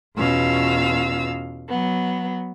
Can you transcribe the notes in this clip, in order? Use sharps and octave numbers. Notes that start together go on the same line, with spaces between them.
E2 B2 C#4 F4 F5 E6
F#3 B3